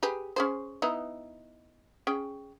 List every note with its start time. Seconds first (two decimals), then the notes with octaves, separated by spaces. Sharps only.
0.03 G4 G#4 B4
0.36 C#4 G#4 C5
0.82 B3 D#4 E4
2.07 C#4 G#4 G5